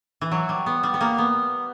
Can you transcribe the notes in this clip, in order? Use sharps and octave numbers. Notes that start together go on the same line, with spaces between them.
E3
F#3
G3
B3
G3
B3
A#3
B3